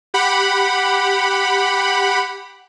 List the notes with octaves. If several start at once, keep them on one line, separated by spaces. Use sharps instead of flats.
G4 F#5 B5